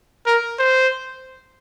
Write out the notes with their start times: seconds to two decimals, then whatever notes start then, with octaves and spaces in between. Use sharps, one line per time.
0.26 A#4
0.59 C5